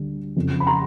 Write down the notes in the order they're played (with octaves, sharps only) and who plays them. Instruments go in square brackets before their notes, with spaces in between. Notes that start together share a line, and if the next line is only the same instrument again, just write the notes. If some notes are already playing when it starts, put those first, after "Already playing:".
Already playing: [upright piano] D2 D3 G3
F#1 F2 C#3
B5
A#5 C6